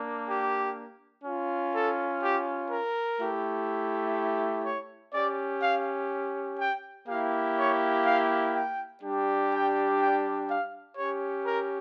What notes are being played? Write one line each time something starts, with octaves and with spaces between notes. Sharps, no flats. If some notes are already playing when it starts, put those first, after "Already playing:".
Already playing: A#3 D4
G4
C#4 F4
A4
G4
A#4
A3 E4 G4
C#5
C#4 G4 D5
F5
G5
A#3 E4 G4 F5
C#5
F5
G5
G3 D4 G4
G5
G5
F5
C#4 G4 C#5
A#4